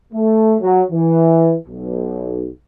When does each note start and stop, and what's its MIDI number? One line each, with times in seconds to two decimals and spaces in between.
0.13 0.55 57
0.61 0.81 54
0.91 1.54 52
1.67 2.48 35